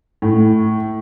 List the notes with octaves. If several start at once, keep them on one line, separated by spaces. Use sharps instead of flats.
A2